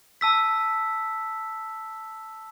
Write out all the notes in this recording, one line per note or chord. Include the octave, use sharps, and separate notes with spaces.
A5 E6 B6